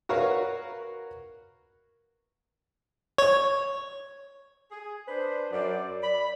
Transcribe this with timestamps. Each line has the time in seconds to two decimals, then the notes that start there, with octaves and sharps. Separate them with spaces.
0.09 F#4 A#4 B4 C#5 F5 F#5
3.18 C#5
4.72 G#4
5.08 D4 B4 C5
5.52 F#2 D5
6.03 D5 B5